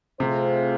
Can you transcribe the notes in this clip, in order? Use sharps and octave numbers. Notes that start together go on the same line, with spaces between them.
C3 A3 C4 F4 G#4 C5